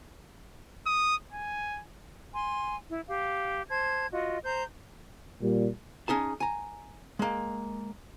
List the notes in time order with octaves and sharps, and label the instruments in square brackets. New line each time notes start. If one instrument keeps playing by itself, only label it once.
[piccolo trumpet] D#6
G#5
[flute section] G#5 C6
E4
G4 F5
C5 A5 G#6
F4 F#4 D#5
C5 A#5 G6
[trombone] A#2 [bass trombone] G3
[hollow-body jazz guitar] C#4 D#4 G#4 A5
G#5 A#5
G#3 A#3